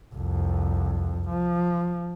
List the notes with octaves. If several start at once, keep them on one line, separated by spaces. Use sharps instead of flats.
C2 F2
F3